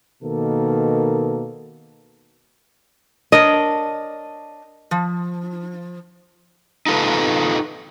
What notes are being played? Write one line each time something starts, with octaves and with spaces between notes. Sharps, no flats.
B2 D#3 A#3 A4
D4 A#4 C#5 D#5
F3
D#4 F4 A4 B4